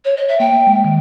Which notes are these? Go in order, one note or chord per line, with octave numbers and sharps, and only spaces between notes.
C#5
D#5
E5
A#3 G5
G#3
D#3